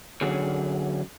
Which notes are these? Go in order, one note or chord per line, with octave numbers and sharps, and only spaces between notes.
D3 F#3 C#4 G#4